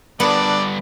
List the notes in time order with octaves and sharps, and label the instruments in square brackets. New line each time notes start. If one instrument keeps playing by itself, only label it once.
[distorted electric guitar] G2 D3 [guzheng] B3 [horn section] D4 [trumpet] D5